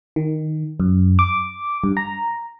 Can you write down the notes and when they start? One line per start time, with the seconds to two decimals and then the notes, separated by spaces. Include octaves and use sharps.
0.16 D#3
0.80 F#2
1.19 D6
1.84 G2
1.97 A#5